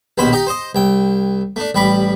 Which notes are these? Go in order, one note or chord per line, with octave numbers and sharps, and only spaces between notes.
A#1 D#2 B2 C5 B5
D#4 G4 D#5
C5 D#5
C2 G5
A3 D4
A1 G3 B5 D6